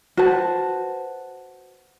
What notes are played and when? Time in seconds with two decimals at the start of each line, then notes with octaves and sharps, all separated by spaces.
0.17 F#4 B4 C5 A5